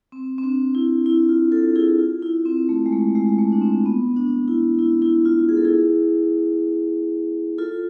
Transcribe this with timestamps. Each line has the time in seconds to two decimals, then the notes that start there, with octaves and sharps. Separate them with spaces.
0.12 C4
0.38 C4
0.43 D4
0.75 E4
1.06 E4
1.29 F4
1.52 F4 A4
1.76 E4 G#4
1.99 F4
2.22 E4
2.46 C4
2.69 A3
2.86 G#3
2.92 A3
3.15 G#3
3.39 A3
3.53 D4
3.62 C4
3.86 B3
4.16 D4
4.48 E4
4.79 E4
5.02 E4
5.25 F4
5.49 G#4
5.57 A4
5.65 E4 G#4
7.58 F4 A4